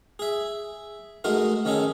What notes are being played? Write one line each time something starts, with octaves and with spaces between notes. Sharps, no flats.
G#4 E5
G#3 A3 D#4 F#4 A#4
D#3 C#4 D#4 G#4 A4